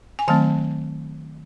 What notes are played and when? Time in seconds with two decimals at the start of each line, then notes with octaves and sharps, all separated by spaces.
0.19 G#5
0.28 D#3 F#3 A3 C4 A5